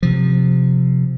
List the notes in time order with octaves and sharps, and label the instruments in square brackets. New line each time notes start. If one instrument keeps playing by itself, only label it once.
[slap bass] C3 F3